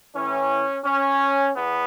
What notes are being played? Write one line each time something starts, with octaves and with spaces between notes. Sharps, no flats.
A2 E3 C#4
C#4
E2 B3